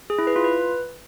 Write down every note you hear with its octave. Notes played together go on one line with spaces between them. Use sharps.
G#4
E4
B4
F4
B4